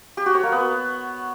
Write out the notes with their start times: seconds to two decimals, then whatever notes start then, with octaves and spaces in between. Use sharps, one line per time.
0.17 G4
0.26 F#4
0.35 C#5
0.43 A#3
0.52 B3